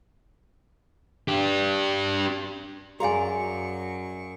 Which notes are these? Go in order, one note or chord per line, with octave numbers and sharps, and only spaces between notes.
D4 G4
F#2 F#4 G#4 D5 F5 G#5 A#5 C#6